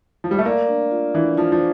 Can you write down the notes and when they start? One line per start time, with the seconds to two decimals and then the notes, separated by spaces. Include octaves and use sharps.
0.24 F3
0.31 G3
0.39 A3
0.45 A#3 D5
0.68 D4
0.91 F4
1.15 E3 D4
1.37 F3 F4
1.52 F3